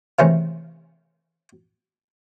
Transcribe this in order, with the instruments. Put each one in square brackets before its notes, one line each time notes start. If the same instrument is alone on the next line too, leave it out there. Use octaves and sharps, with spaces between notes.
[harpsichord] C3 D#3 E3 G#3 A3 C#4